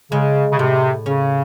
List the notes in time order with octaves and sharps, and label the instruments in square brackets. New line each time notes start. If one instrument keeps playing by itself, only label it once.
[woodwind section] C#3 [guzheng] G#3
[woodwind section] C#3
[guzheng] A2 [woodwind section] C3
[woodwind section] C#3 [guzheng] C#4